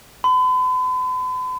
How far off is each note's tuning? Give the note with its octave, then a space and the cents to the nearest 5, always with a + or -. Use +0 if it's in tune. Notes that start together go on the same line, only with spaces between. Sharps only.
B5 +45